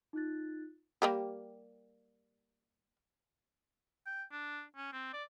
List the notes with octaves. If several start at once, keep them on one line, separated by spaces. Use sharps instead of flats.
D#4 F4 F#6 A6
G3 A#3 G4
G5
D4
C#4
C4
D5